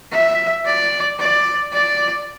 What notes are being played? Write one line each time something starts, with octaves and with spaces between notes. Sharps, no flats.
E5
D5
D5
D5